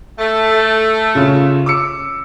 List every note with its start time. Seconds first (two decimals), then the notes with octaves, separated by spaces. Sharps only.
0.19 A3
1.15 C#3 C#4 F4
1.66 D6 E6 C#7